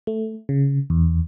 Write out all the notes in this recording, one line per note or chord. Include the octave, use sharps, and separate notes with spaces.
A3
C#3
E2